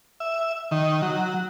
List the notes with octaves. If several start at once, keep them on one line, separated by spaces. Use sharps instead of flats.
E5
D#3
F#3